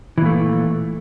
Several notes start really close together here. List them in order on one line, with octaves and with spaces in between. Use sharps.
E3 A#2 A3